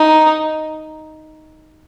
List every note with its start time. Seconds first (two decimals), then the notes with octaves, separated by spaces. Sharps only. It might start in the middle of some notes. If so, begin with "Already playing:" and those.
Already playing: D#4